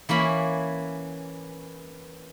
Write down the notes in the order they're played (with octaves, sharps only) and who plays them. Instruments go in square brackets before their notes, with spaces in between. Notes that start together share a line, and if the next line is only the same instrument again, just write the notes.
[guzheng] E3 A#3 C#4 B5